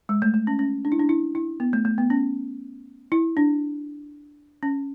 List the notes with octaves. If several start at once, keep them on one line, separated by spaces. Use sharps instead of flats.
G#3
A3
A3
C#4
C#4
D4
E4
D4
E4
E4
B3
A3
A3
B3
C#4
E4
D4
C#4